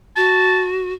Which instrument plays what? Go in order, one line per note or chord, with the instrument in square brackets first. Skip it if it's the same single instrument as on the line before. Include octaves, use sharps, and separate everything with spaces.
[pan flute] F#4 [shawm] A5